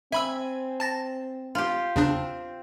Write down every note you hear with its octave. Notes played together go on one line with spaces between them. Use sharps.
C4 E5 G#5 B5 E6
A5 A6 A#6
F4 G4
E2 C#3 C4 D4